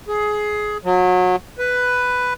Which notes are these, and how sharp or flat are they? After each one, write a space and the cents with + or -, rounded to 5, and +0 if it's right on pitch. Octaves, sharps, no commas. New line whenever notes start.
G#4 +15
F#3 -25
B4 +5